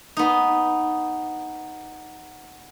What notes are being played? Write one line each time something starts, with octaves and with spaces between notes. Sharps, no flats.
B3 D#4